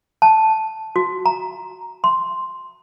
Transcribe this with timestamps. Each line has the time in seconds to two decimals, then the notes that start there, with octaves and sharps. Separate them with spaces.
0.22 A5
0.96 F#4
1.26 A#5
2.04 C6